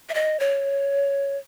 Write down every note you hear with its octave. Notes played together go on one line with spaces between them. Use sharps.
E5
D#5
C#5